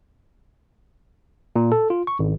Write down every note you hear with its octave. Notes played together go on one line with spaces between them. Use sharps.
A#2
A4
F4
C#6
G#1